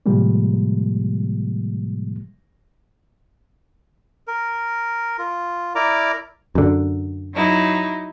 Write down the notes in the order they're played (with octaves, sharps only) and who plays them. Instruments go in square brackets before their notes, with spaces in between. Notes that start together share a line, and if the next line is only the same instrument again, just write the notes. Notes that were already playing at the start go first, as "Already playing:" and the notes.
[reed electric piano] A2 C3 F3 G3 G#3 A#3
[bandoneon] A#4
F4
E4 A#4 D5 A#5 D6
[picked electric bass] F#2 D3
[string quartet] F#3 D#4 E4